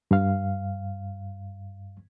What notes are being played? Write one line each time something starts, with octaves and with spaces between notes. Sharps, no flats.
G2 F5